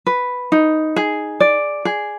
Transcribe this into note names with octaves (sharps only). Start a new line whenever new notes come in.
B4
D#4
G#4
D5
G#4